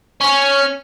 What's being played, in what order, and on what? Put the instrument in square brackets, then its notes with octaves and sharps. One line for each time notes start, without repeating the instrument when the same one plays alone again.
[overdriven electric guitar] C#4